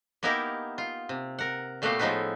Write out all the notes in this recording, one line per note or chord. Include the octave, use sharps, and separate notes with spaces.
A#3 B3 D#4 E4 G4 A#4
F4
C3
A#4 F#5
A#2 A3 B3 F#4 G4 F5
A2 F3 G#3 D#4 A4 B4